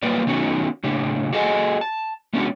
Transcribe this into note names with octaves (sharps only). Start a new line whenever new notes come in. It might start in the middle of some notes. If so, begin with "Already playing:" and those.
F#3 G3 A#3 A#4 B4 D5
D#3 A3 B3 C#4 D#4 F#4
A2 C#3 D4 G4
F#4 G#4 A4 D#5 F#5 G#5
A5
G#3 A3 B3 C#4 D4 F#4